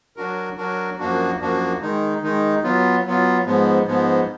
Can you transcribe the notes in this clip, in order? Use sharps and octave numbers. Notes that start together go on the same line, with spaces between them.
F#3 D4 F#4 A#4
F#3 D4 F#4 A#4
F#2 F3 A#3 D4 F#4
F#2 F3 A#3 D4 F#4
D#3 G#3 D#4
D#3 G#3 D#4
F#3 B3 F4
F#3 B3 F4
G#2 F3 G#3 B3
G#2 F3 G#3 B3